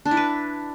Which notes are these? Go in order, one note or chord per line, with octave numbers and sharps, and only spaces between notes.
D4
E4
B4